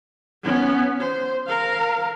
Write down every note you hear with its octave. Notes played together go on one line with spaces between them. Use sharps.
B3 C#4
C5
A#4 F5